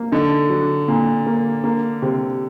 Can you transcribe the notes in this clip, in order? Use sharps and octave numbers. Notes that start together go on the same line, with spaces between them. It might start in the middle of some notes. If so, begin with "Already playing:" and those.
Already playing: A#3
D3 D#4
F#3
A#2
A#3
A#3
C3